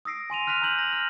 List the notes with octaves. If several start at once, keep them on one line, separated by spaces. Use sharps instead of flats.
D#6 E6 A#6 C7 D7
G#5 C6 D#7 F7
C6 F6 F#6 B6 D#7 F7
A#5 C6 E6 G6 F#7
A#6
F6